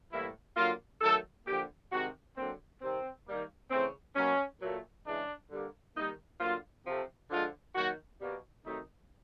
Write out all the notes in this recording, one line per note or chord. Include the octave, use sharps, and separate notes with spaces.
A2 E3 G3 A#3 E4
D3 F#3 A#3 F4
D#3 F#3 A3 A4
D3 F3 A#3 G4
C3 D#3 G#3 F#4
D3 F#3 A#3 C4
C3 D#3 G3 C4
D#3 G3 A#3
C#3 E3 A3 C4
B2 F#3 A#3 C#4
A#2 F#3 A3
C#3 E3 G#3 D4
D3 G3 A#3
D#3 G3 A#3 D#4
D3 F#3 A#3 F4
C3 F3 A3
D3 F3 G#3 F4
D#3 F#3 A#3 F#4
B2 G3 A#3
C3 D#3 F#3 A3 D#4